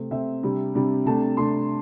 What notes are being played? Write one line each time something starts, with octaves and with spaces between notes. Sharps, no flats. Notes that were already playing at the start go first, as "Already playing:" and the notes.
Already playing: C3 A3 C4
C3 A3 C4 E5
C3 G3 D4
C3 G3 D4
C3 A3 D4 A5
C3 A3 D4 C6